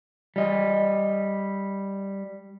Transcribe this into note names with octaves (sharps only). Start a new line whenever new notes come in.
G3 D#5